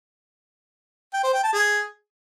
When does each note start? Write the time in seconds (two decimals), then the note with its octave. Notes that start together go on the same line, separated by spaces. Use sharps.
1.14 G5
1.23 C5
1.33 G5
1.43 A5
1.53 G#4